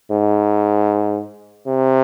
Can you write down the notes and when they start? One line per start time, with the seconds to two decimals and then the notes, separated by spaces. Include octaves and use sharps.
0.11 G#2
1.67 C3